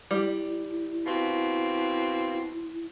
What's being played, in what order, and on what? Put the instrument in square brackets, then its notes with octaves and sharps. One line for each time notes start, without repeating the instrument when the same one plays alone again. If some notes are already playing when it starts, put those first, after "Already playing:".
[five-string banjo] G3 [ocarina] E4
[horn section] B2 A#3 C4